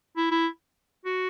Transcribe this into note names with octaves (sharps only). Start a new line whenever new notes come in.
E4
E4
F#4